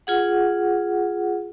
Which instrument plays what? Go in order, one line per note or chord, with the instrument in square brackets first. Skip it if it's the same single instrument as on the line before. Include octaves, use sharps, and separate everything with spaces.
[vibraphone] F4 G#4 F#5